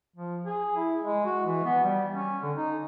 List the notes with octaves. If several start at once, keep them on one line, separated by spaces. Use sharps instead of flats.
F3
G#4
E4
G#3
F#4
E3
B3
G3
C#4
D3
D#4